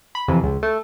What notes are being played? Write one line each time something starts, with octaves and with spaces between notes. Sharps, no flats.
B5
F2 C3 E3
C#2
A3